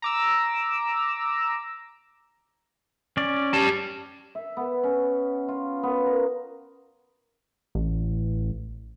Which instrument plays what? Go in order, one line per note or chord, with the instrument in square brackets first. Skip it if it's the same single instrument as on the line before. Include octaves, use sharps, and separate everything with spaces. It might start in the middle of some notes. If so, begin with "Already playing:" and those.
[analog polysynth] A#5 D6 E6
[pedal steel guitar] C#4 D5
[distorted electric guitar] G4 A5
[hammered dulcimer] E5
B3
C#4
F4
B3
A#4
[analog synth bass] A1